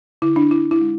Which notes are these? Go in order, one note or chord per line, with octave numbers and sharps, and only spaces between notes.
D3 E4
D4
D4 E4
E4
G#3